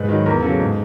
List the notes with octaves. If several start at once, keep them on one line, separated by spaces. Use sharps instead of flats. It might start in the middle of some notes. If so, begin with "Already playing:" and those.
Already playing: G#2 B4
D#3 F#3
E2 A#4
C#3 F#3 A4
G#2